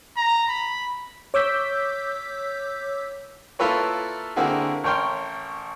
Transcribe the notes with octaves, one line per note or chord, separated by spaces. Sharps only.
A#5
B5
C#5 D6 E6 G6 B6
A#3 E4 F4 A4 B4 C#5
D3 A#3 C4 E4 F#4 G#4
A1 A#4 C#5 G5 C6 F6